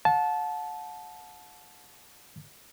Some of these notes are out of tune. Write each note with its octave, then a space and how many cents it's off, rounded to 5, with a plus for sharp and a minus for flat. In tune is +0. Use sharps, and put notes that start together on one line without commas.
F#5 -45 A5 -20